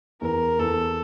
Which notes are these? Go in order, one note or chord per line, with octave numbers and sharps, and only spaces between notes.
E2 A#4
E2 A4